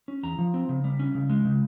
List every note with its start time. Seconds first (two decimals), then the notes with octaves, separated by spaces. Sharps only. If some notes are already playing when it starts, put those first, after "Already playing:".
0.08 C#4
0.23 E2 A#5
0.39 F3
0.54 C4
0.69 C#3
0.84 G3
0.99 C#4
1.15 C#3
1.30 G#3
1.45 C#3